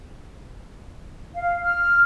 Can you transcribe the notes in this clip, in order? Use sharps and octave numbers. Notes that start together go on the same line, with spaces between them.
F5
F6